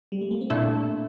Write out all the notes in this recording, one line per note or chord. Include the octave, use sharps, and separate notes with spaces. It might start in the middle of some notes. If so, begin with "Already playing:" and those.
G3
A3
A#3
C4
A#2 A3 D4 E4 A4